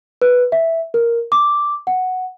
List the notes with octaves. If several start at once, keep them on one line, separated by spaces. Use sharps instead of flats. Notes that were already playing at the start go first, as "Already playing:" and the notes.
B4
E5
A#4
D6
F#5